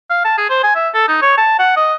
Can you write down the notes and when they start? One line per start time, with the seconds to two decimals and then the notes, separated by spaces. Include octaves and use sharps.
0.10 F5
0.25 A5
0.38 G#4
0.50 C5
0.63 G#5
0.76 E5
0.94 A4
1.08 D#4
1.22 C#5
1.38 A5
1.59 F#5
1.77 D#5